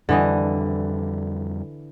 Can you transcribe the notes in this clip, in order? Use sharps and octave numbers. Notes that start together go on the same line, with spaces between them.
F2 D3 E3 G3 D#5